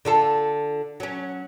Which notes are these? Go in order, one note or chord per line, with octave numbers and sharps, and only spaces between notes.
D3 F4 A4
F#3 C#4